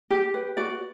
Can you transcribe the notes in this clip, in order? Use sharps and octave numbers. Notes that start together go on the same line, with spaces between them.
G4
B4
F#4 D5